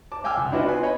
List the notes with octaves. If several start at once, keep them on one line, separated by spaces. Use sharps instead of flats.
A5 D6
F5 G5 G#5 D6 E6 F6
C#2
D4 E4 F#4 B4 D#5 E5
B3 F4 B4 G#5
C#5 D#5 B5